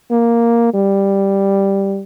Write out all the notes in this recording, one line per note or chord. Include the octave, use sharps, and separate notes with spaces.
A#3
G3